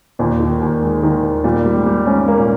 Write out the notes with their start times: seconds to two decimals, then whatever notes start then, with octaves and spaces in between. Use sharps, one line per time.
0.19 D#2 A#2
0.40 D#3
0.61 D#2
0.82 G#3
1.03 D#3
1.23 D#2
1.44 A#2 G3
1.66 G3
1.76 G#2
1.86 G3
2.07 G#2 C#4
2.26 G#2 A#3
2.39 A#2